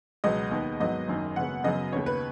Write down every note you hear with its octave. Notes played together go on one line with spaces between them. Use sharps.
C#2 B2 F#3 B3 D#5
D#2 D#3 B3
G#1 G#2 F#3 B3 D#5
F#1 F#2 D#3
G#1 F#2 C#3 B3 F#5
F#2 C#3 F#3 B3 D#5
D#2 C#3 B3 C#5
B4